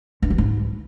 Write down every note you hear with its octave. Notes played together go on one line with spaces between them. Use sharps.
G2
E3
G#2